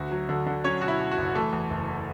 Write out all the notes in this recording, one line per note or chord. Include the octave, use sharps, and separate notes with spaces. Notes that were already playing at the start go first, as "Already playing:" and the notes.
Already playing: D2 F#4
F#3
D3
D3
F#3 C#4 C#5
B2 F#4
E4
B2
F#4
F#1
E3 A3 A4
E2
F#1